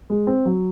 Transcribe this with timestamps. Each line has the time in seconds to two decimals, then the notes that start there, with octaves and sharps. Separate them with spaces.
0.10 G#3
0.27 C4
0.45 F#3